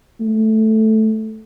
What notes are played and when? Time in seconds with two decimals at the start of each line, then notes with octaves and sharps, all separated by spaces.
0.21 A3